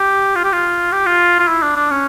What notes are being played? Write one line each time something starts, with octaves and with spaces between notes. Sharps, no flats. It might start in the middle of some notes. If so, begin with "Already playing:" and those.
Already playing: G4
F4
G4
F4
G4
F4
F4
E4
D4
D4
C#4